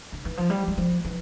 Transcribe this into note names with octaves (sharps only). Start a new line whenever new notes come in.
D3
E3
F3
G3
G3
F3
E3